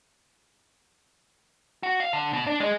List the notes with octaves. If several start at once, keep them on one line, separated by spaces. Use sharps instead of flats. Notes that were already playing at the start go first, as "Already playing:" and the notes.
F#4
F5
D3
B2
D4
G#3